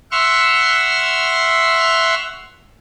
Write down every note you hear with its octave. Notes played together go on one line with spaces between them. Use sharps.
E5 F#5 C6 C#6 E6 F6